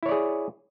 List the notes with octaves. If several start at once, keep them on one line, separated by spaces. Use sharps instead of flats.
E4 G#4 C#5 D5